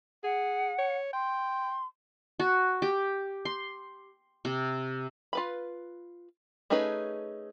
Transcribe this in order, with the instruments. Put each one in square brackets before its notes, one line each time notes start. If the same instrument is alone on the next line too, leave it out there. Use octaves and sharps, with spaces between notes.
[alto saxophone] G#4 [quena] F#5
[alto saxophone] C#5
[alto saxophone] G5 [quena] C6
[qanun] F#4
G4
C6
C3
[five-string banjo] F4 B4 B5
A3 C#4 D#4 G#4 B4